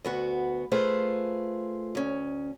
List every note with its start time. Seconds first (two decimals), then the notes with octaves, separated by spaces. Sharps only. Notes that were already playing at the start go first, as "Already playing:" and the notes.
0.04 D2 B3 F#4
0.72 A3 F4 G#4 B4 C5
1.95 D2 C#4